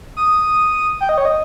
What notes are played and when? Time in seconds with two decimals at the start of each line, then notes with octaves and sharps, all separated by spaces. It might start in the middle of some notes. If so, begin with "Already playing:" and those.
0.17 D#6
1.01 G5
1.09 D#5
1.18 C#5
1.25 D#5